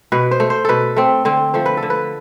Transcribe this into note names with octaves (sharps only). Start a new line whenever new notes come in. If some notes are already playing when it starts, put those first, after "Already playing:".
B2 B4
C5
A3
C5
B2 A4 B4
A3 C4
D3 C4
F3 A3 C5
B4
A4
D3
B4